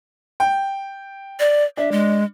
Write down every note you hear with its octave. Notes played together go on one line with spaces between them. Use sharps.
G5
D5
D4 E5
G#3